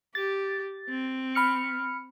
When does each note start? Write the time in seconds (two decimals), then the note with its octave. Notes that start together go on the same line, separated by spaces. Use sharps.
0.15 G4 A6
0.89 C4
1.35 B5 F6 C#7